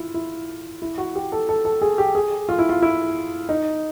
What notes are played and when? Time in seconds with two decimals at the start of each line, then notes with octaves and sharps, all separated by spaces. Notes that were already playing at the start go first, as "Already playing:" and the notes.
Already playing: E4 F4
0.14 E4
0.82 E4
0.98 F#4
1.15 G4
1.32 A4
1.49 A4
1.65 A4
1.82 G#4
1.98 G4
2.15 G#4
2.49 F4
2.59 E4
2.69 F4
2.82 E4
3.49 D#4